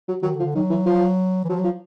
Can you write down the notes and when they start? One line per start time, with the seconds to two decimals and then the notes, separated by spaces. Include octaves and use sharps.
0.08 F#3
0.23 D#3 F#3
0.34 D3
0.39 F3
0.45 D3
0.55 D#3 F#3
0.70 E3
0.86 F3
1.44 E3
1.49 F3 F#3
1.59 F#3
1.64 F3